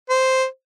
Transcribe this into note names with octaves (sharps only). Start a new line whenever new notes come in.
C5